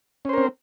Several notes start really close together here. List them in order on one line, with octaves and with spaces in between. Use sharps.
C#4 C5 A#4 C4